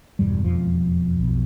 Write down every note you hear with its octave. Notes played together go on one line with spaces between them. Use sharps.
E1 E2 G2 B2 G3
F2 F3
B1 B2